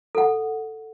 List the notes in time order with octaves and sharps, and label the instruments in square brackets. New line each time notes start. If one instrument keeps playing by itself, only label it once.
[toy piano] A4 F#5